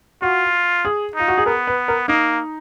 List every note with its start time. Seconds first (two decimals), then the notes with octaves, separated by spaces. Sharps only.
0.22 F4 F#4
0.85 G#4
1.16 D#4 F4
1.28 F#4
1.37 G#4
1.46 B3 A#4
1.67 B4
1.88 A#4
2.08 A#3 D#4